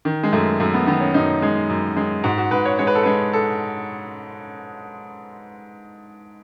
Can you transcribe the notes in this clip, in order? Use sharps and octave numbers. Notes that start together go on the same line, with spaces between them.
D#3
G#3
F#2 A3
F#2 A3
B3
D#3 B3
C#4
F#2 D#4
G#3
F#2
G#3
G#2 F#4
F#4
G#2 B4
C#5
G#3 C#5
B4
A4
G#3 B4
A4